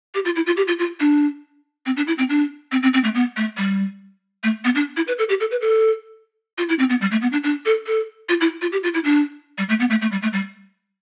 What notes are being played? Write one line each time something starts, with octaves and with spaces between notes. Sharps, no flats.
G4
F4
E4
F4
G4
F4
F4
D4
C4
D4
E4
C4
D4
C4
C4
C4
A3
B3
A3
G3
A3
B3
D4
E4
B4
A4
G4
A4
B4
A4
F4
E4
C4
B3
G3
A3
B3
D4
D4
A4
A4
F4
E4
F4
G4
F4
E4
D4
G3
A3
B3
A3
A3
G3
A3
G3